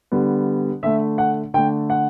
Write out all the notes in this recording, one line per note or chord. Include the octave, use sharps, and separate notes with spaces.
D3 G3 B3
D3 A3 E5
F#5
D3 A3 G5
F#5